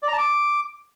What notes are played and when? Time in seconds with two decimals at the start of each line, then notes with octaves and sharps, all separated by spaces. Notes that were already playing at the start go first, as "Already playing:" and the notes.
0.03 D5
0.08 A#5
0.13 A5
0.18 D6